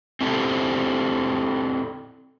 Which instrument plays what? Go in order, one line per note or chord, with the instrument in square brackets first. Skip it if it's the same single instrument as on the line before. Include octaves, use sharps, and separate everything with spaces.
[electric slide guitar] C4 D4 E4 G4 A4 C5